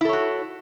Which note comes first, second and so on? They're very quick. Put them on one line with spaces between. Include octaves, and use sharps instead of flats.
E4 A4 C#5 F#4